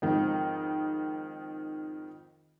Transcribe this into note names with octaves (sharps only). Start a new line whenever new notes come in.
F2 G#2 D#3